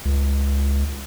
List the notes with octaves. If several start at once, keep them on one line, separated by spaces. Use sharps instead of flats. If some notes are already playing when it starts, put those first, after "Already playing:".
C#2